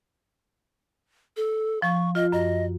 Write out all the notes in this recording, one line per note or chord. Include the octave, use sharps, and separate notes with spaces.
A4
F3 C#6
F4 D#5
F#2 D#5